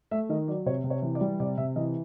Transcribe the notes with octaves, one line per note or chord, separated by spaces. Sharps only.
A3 E5
D#3 D#5
F#3 D5
C3 C#5
C3
C#5
E3
D5
G3
C3 D5
C3 E5
E3 D#5